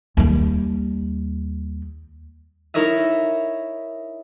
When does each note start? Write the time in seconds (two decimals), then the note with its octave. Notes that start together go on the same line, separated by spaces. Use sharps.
0.17 D#2 G3
2.74 D#4 E4 A#4 C#5 D#5 E5